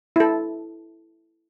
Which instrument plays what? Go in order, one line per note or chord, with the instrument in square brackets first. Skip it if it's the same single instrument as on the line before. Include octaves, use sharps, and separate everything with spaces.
[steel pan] E4 A4